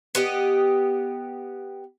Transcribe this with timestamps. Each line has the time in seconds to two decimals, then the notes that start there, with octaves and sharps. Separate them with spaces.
0.15 B3 G4 D#5